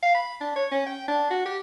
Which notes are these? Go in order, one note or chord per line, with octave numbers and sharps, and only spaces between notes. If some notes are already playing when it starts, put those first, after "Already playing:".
F5
B5
D4
C#5
C#4
G5
D4
F#4
G4